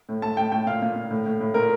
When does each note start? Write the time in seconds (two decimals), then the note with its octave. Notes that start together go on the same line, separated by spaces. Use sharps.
0.09 A2
0.22 A2 A5
0.37 A2 G5
0.52 A2 G5
0.66 A#2 F5
0.82 A#2
0.96 A#2
1.11 A2
1.26 A2
1.40 A2
1.54 A#2 A#4